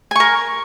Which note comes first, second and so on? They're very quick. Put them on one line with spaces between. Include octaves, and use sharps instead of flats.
G#5 C#6 A#4